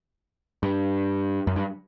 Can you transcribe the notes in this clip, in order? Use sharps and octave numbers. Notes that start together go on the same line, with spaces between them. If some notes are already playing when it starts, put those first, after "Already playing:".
G2
F#2
G2